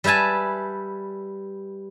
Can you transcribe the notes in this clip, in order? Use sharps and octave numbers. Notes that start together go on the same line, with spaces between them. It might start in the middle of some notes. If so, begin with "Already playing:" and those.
G3 B4 E5 G#5 A5